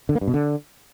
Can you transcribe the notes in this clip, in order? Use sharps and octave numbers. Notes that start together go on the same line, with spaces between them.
D3
A#3
G2
B2
D3